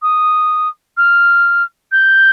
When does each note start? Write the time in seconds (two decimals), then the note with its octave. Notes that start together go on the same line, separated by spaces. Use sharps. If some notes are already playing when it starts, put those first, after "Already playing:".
0.02 D#6
0.97 F6
1.92 G6